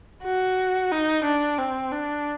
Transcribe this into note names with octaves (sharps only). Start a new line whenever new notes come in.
F#4
D#4
D4
C4
D4